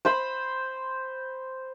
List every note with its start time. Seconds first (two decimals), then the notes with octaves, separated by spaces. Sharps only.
0.05 C5 B5